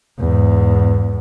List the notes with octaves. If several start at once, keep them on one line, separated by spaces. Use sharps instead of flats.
E2 G#2